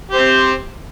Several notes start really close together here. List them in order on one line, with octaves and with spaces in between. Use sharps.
G4 C5 C4